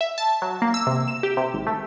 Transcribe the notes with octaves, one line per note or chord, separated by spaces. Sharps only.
E5
A5
F#3
A#3
E6
C3
E7
G4
C3
G#1
A3